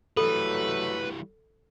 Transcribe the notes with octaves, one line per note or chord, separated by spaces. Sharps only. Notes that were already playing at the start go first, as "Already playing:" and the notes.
E3 F#3 G3 A3 A4 B4